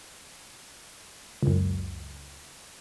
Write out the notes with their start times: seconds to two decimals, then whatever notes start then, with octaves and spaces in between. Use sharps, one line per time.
1.43 C#2 F#2